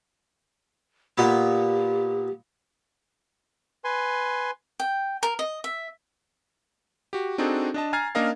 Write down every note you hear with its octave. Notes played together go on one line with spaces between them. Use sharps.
A#2 B3 G4
B4 G#5 C6
G5
A#4
D#5
E5
F#4 G4
C4 D4 D#4 F#4 G#4 A4
D4 D#5 A5
G#5 A#5 F6 G#6 A6 C7
A#3 C#4 D4 A#4 D#5 F5